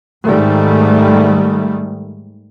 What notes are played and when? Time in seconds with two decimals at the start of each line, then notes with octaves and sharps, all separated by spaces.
0.24 G#2 D#3 G3 A3